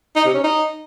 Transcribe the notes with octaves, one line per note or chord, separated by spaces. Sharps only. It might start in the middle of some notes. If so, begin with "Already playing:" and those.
D#4
C3
C#4
D#4